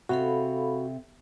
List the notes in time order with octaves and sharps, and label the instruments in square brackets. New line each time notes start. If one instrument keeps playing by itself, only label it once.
[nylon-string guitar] C3 [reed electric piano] F#4 [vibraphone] A4 F5 B5